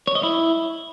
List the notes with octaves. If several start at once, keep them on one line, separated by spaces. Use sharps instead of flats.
C#5
D#5
E4